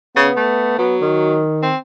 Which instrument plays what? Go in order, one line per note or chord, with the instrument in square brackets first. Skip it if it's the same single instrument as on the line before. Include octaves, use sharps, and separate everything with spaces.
[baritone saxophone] C#3 [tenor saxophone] B3
[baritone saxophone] A3
[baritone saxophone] F#3 [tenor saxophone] B3
[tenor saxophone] D#3
[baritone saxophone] C4